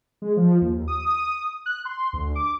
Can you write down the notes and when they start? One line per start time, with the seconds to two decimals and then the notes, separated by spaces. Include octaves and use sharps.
0.22 G#3
0.37 F3
0.61 D#2
0.88 D#6
1.66 F#6
1.85 C6
2.13 D2
2.35 D6